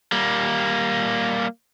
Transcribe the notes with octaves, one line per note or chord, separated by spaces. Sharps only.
G3 A#3